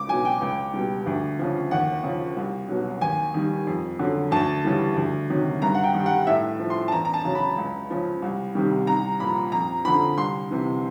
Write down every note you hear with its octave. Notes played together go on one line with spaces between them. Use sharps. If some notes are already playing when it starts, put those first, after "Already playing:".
Already playing: C#2 D6
F#3 G#5
B2
G5
C#2
B2 G3
D2
C#3 F3
D#2 F#5
C#3 F3
C2
B2 F#3
D#2 G#5
D#3 G3
F2
D3 F#3
D2 A5
C#3 E3 G3
D2
C3 D#3 F#3
G2 A#5
F#5
G5
D#3 G3
F#5
A2 E5
F3
C6
A5
E2 A#5
A#5
A5
C#3 F#3
B5
C#2
C#3 F3
C2
C3 D#3 G3
C2 A#5
A#2 F3 B5
F2 A#5
D3 F3 B5
C2 C6
C3 E3